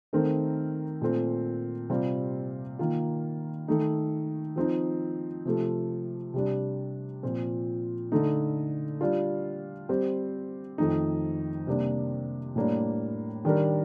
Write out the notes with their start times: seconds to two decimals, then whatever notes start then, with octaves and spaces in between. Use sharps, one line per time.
0.13 D#3 A3 C4 D#4 A#4
1.01 A#2 A3 C4
1.89 C3 G3 C4 F4
2.79 D#3 A#3 F4
3.68 D#3 A3 D#4
4.56 F3 C4 D#4
5.45 C3 F3 A3
6.34 C3 G3 D4
7.23 A#2 F3 C4
8.12 D3 A3 D#4
9.01 G3 D4 F4
9.89 G3 C4 G4 C5
10.78 F2 D#3 A3 D#4
11.67 C3 G3 A#3 D4
12.56 A2 G3 A#3 D4 G4
13.45 D#3 G3 D4 G4 A#4